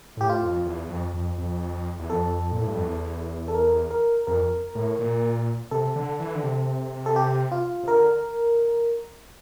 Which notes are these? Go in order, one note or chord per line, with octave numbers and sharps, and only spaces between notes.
A2 G4
F4
F2
E2
F2
F2
F2
E2
F2 A4
A#2
A2
G2
F2
E2
A4
A#4
A#4
F2 A#4
A2
A#2
C3 A4
D3
E3
D3
C3
A4
G4
F4
C3
D3 A#4